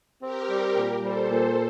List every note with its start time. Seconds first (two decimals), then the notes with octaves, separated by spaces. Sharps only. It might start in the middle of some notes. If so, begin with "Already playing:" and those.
0.23 C4 G4 A#4
0.50 G3
0.77 A#2
1.02 G3 A4 C5
1.29 A#2